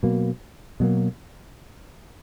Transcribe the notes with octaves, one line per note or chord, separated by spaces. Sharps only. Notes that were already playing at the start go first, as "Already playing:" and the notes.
B2 F#3 A#3
B2 F#3 A#3